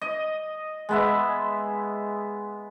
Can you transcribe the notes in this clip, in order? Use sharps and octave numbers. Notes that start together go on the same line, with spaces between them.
D#5
G#3 B3 E5